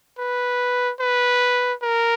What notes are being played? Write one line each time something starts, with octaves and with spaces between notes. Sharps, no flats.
B4
B4
A#4